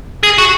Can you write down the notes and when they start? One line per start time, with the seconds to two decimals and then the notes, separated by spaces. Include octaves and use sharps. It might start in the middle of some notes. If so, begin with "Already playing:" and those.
0.23 G#4
0.38 F#4